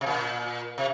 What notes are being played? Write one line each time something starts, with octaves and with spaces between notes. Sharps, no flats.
C3
A#2
C3